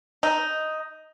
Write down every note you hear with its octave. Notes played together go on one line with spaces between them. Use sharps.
D#4